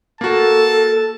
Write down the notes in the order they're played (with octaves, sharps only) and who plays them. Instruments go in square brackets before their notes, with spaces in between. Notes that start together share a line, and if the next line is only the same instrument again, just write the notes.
[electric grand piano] A#3 F#4 [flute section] A4 [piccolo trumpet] A5